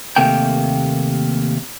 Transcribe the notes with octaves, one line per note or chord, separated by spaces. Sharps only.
D#2 C3 A3 A#3 G5